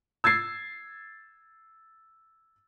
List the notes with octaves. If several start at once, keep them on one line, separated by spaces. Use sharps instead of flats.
E6 G#6 A6 C7